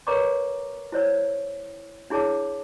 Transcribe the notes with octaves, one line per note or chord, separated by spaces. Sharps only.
A#4 B4 C#5 A#5 C#6 D6
E4 C5 C#5 E6
D4 E4 G#4 C#5 A5 D6